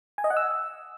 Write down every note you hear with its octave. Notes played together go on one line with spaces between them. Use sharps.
G#5
D#5
F#5
E6